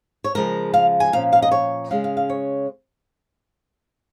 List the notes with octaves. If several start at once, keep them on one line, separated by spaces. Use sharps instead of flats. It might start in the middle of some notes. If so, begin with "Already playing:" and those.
C#5
C#3 F3 G#3 A#4
F5
G#5
A#2 F3 C#4 F5
F5
D#5
C#5
C#3 G#3 C#4 F5
F5
F5
C#5